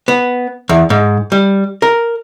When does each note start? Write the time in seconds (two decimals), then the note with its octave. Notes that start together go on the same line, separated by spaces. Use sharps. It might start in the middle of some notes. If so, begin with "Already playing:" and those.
0.08 B3
0.69 E2
0.90 G#2
1.32 G3
1.82 A#4